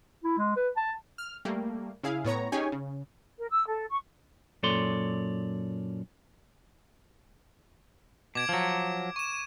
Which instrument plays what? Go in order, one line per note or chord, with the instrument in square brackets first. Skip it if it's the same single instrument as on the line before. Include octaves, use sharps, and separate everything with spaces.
[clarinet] E4
G#3
B4
A5
[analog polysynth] F6
G3 A3 A#3
C#3 E4 G#4 F5
A2 B3 C#5 A#5
C#4 D#4 G4 G#4 C#5 G#5
C#3
[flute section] A#4
E6
A4
C#6
[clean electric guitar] F#2 A#2 A4 C#5 D5 C6
[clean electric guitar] B2 [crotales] D6 G#6 D7
[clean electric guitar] F3 F#3
[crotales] C#6 E7